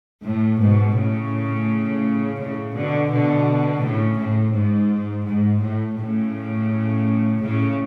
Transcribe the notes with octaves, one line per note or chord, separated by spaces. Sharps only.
A2
G#2 B2
A2 C#3
A2 C#3
B2 D3
B2 D3
A2 C#3
A2
G#2
G#2
A2
A2 C#3
A2 C#3